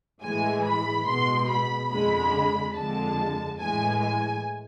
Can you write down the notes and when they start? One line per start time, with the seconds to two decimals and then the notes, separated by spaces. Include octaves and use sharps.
0.22 A2 E3 G#3 G#5
0.65 B5
1.07 B2 G#3 C6
1.49 B5
1.90 F2 D3 G#3 B5
2.74 F2 D3 G#3 A5
3.58 A2 E3 G#3 G#5
4.00 G#5